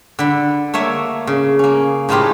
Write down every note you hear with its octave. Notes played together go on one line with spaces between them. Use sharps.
D3 B5
A3 A#3 C#5 E5
C#3
A#3 C#4
A2 F3 G#3 D#4 F4 G4